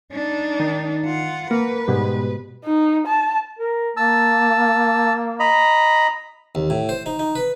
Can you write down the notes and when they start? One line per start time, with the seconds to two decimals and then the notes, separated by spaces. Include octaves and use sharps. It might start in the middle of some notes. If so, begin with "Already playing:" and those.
0.12 D4 D#4
0.60 D#3
1.05 F4 F#5
1.51 A#3 B4
1.88 G#2 B2 G3
2.65 D#4
3.07 A5
3.59 A#4
3.97 A#3 A5 E6
5.40 D#5 A#5 B5
6.55 D#2
6.70 A2
6.89 C5
7.06 D#4
7.19 D#4
7.35 B4